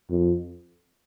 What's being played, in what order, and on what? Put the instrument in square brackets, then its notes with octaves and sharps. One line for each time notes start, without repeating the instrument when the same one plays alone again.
[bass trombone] F2